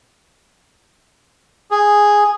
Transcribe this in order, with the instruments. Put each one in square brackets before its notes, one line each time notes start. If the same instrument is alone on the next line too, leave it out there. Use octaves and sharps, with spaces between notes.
[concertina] G#4